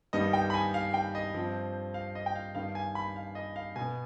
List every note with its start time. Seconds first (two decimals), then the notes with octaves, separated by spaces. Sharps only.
0.13 G2 D#3 G3 B3 D#5
0.33 G5
0.50 B5
0.54 G#5
0.74 F5
0.94 G5
1.15 D#5
1.34 G2 F3 C4
1.94 F5
2.15 D#5
2.26 G5
2.36 F5
2.55 G2 D#3 B3 F5
2.75 G#5
2.95 B5
3.16 F5
3.35 D#5
3.56 F5
3.76 B2 G#5
3.81 B3